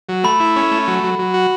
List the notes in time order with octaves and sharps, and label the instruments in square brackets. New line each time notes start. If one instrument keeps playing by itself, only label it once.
[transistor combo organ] F#3
[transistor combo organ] A3 [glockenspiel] B5
[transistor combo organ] E4
C#4
A3
F#3
F#3
F#3
F#4